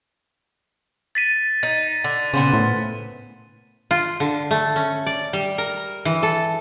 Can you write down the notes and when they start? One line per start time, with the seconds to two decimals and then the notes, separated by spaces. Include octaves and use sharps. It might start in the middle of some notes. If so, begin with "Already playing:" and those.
1.15 A6 B6 D#7
1.63 D#4 A6
2.04 D3
2.34 A#2 C#3 B3 C5
2.53 A2
3.91 F4
4.20 D3
4.51 A3
4.76 C#4
5.06 D5
5.33 G3
5.58 A#4
6.05 E3
6.23 A4